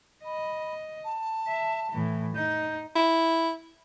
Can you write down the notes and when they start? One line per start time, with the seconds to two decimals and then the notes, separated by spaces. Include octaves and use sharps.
0.25 D#5 B5
1.04 A5
1.48 E5
1.91 A2 E3
2.35 D#4 G6
2.96 E4